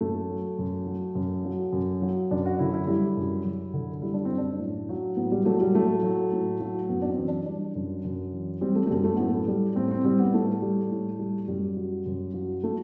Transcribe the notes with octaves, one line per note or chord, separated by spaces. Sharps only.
F#2 A3
F#3
F#2
F#3
F#2
F#3
F#2
F#3
F#2 D4
F#4
D3 E4
E4
G3 E4
F#2
F#2
D3
G3 E4
D4
C4
F#2
D4
A2
F#3
A2 B3
G3
F#3 A3
G3
A2 A3
F#3
A2
F#3
F#2 B3
D4
C4
E3
D4
G3 D4
F#2
F#2
E3
G3 C4
A3
A3
F#2 G3
A3
A2 B3
A3
G3
A2 C4
C4
G3 C4
B3
A2 A3
G3
A2
G3
F#2 G3
F#3
F#2
F#3
A3